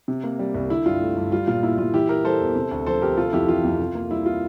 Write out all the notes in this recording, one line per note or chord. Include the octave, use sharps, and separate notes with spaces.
C3
A#3
G3
C2
D3 E4
G2 F4
A3
G2
G3 F4
A#2 F4
A#3 E4
A#2 F4
E3 E4 G4
A#3 G4 A#4
G3 A4 C5
E2
C3
D2
F3 A4 C5
D2 G4 A#4
C3 F4 A4
F2 E4 G4
E3 F4
F2
C3
A#3
G3 E4
F4